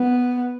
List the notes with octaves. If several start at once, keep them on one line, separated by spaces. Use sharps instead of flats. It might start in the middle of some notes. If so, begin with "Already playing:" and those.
Already playing: B3